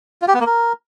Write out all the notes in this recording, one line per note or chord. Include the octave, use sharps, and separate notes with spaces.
F4
G4
B3
A#3
A#4